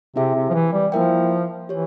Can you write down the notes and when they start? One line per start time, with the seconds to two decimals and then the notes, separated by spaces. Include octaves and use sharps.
0.16 C3 C4 E4 G#4 E5 G5
0.35 C3
0.50 F3
0.54 E3
0.73 G3
0.92 F3 A#3 E4 A#4 E5 G5
1.68 E3 G4 C#5